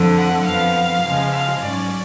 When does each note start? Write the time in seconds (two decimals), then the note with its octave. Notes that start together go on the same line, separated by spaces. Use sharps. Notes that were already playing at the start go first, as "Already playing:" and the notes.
Already playing: F2 D3 F3
0.17 F#5
0.45 F2 F3 B3 F5
1.03 C#3 F3 G#3
1.32 F5
1.61 G#2 F#3 C#4 D5